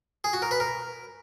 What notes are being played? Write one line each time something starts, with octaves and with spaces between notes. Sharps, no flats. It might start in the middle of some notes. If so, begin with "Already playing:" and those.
G#4
F#4
A#4
B4
A#4